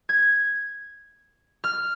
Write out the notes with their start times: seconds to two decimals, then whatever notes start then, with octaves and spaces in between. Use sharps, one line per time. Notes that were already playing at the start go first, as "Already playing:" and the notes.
0.09 G#6
1.64 F6